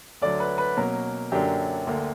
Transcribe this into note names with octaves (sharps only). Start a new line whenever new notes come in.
D2 D3 F#3 D5
B4
B4
B2 F#3 A#3 C#4 A#4
F#2 D3 F#3 A#3 D4 G4
D2 D3 A#3